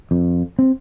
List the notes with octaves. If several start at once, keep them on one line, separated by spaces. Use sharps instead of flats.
F2
C4